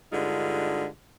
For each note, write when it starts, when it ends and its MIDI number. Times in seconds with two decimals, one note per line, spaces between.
0.12 0.86 43
0.12 0.86 50
0.12 0.86 56
0.12 0.86 63
0.12 0.86 65